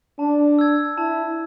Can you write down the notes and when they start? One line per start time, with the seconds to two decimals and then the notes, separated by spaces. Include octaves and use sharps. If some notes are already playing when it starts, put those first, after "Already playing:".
0.19 D4 A5
0.59 E6 G#6
0.98 E4 A5